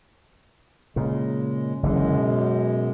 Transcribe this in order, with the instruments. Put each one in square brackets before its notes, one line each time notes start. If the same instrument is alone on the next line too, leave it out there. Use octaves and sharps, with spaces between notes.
[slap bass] A#2 C#3 [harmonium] G#3
[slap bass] F#1 D3 E3 [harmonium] F#2 G#3
[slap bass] B2